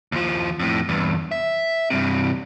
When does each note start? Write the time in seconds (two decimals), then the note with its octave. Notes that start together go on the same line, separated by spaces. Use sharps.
0.12 D#2 F3
0.60 F2 A2
0.89 E2 G2
1.32 E5
1.90 G2 C3